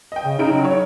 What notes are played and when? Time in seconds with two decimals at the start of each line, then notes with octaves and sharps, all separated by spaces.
0.12 D#5 G5
0.25 C#3
0.39 C#3 D#4 E4 D7
0.52 F#3
0.65 C#5